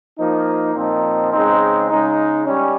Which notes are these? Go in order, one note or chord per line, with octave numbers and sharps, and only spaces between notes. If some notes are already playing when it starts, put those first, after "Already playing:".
F3 A#3 D#4
A#2 F3 C4 D#4
C#3 G#3 C4 D#4
C#3 G#3 D#4
G3 C#4